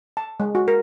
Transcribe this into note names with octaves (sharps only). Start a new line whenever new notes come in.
A5
G#3
F#4
A#4